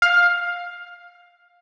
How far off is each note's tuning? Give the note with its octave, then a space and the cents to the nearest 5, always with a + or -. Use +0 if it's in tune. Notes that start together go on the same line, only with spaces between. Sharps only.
F5 +10